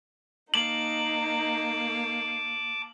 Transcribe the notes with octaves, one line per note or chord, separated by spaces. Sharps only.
A#3 D#4 A5 D6 F#7